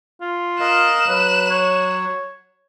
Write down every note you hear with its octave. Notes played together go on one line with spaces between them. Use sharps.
F4
A#4 D#5 F5 F#6 E7
F#3 B4
C#5